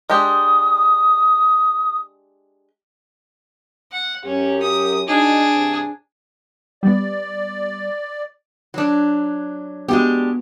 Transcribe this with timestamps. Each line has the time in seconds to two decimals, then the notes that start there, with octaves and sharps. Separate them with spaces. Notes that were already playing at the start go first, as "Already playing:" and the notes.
0.10 G#3 D4 G4 D#6
3.92 F#5
4.25 F#2 C#4 G4
4.62 D#6
5.07 D4 D#4 F#4 G#4
5.55 G2 C3 C4
6.83 G3 B3 D5
8.74 F#3 D4
9.88 G#3 B3 D4 F#4 G4